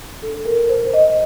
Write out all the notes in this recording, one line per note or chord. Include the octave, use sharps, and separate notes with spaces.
D4 A4
A#4
A#2 C5
D#5